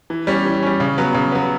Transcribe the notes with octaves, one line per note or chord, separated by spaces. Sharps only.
E3
G3 C#4
E3
G3 C#4
C#3
F#3 B3
C#3
F#3 B3